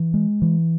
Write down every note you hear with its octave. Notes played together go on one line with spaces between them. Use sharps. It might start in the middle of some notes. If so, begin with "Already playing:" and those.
Already playing: E3
G#3
E3